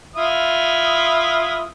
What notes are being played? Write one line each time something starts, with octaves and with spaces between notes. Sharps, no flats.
E4 F4 D#6